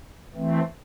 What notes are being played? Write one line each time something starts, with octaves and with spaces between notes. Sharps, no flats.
E3 A3 C4